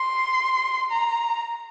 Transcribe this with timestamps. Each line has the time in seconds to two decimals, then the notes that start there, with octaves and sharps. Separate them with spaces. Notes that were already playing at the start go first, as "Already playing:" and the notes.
Already playing: C6
0.91 A#5